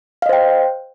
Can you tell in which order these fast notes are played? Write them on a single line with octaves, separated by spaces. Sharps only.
F5 D#5 C5 G5